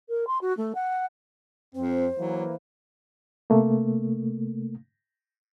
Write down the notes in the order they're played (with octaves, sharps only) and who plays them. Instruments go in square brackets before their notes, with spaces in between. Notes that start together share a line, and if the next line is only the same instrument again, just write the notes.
[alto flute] A#4
C6
F#4
A3
F#5
[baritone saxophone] F2 [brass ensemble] C4 [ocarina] C5
[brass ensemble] E3 A#3 [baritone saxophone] F#3
[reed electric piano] C3 A3 A#3